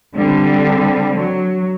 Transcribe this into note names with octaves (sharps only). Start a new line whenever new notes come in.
D3 G3 C4
F#3